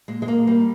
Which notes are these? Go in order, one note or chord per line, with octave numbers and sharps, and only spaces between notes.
A#2 G#3
G#3
A#3
G3 A#3